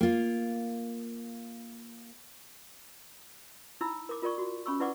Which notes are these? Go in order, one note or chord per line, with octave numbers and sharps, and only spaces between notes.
A#3 F4
D#4 E4 A#5 B5 E6
A#4 D6
F4 A#4 D5 C#6
F#4
C#4 B5 C#6 E6
E4 B4 D5 F#5 C#6 D6